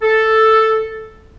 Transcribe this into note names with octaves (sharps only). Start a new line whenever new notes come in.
A4